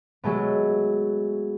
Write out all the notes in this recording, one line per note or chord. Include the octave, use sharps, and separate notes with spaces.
F#3 G#3 A3 B3